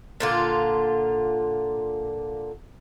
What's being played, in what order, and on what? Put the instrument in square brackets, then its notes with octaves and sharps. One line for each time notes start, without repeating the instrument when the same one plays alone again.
[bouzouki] A#2 D3 F4